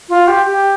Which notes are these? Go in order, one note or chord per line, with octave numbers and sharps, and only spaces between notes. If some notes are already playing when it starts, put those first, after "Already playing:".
F4
G4
G4